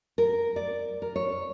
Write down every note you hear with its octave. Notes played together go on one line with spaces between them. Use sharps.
A#4
D5
A#4
C#5